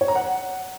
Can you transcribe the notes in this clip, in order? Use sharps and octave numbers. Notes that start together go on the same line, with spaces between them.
C#5
A#5
F#5